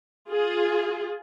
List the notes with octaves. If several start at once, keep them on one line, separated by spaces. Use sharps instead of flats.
F4 G#4